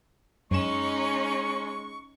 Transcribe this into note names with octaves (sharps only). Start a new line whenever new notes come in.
F#2 G#3 C#4 D#4 C#6 E7